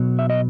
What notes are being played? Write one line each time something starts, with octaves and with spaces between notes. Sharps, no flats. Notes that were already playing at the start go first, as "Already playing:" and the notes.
Already playing: B2 F#3 B3
E5
D#5